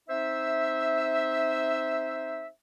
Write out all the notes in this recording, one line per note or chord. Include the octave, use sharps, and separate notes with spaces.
C4 D#4 C5 E5